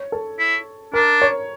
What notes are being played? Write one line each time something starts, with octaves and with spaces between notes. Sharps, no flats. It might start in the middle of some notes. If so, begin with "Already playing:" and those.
Already playing: C#5
A4
E4
D4 A#4
C#5